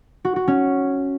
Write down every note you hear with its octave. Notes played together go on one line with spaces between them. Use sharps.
F#4
F#4
C#4